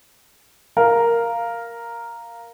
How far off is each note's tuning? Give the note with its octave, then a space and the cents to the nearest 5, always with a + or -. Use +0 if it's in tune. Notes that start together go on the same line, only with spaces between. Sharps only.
A#4 +0 F5 -5